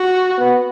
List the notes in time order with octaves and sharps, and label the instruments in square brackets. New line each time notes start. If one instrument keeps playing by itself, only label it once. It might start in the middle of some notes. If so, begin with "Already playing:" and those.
Already playing: [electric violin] F#4
[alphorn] B3